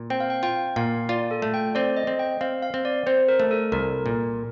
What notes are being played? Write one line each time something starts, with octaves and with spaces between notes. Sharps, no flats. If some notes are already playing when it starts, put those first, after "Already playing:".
Already playing: A#2
C4 G5
F5
G5
F4 G5
A#2 F5
F4 D5
A4
A3
G5
C4 D5
D#5
C4
G5
C4 F5
F5
C4
D5
C4 C5
A#4
A3
A4
C2 A#4
A#2